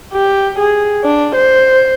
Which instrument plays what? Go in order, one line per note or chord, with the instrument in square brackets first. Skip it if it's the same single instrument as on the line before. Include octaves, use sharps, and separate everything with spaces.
[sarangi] G4
G#4
D4
C5